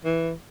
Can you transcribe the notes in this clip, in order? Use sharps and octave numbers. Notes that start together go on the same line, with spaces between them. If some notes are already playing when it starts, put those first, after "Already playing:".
E3